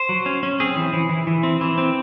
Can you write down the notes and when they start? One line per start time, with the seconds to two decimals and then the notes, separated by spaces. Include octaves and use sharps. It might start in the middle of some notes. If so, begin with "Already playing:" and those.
Already playing: C5
0.09 F#3
0.26 C#4
0.43 C#4
0.60 C4 G#4
0.76 E3
0.93 E3
1.09 E3
1.27 E3
1.43 C4
1.61 E3
1.78 C4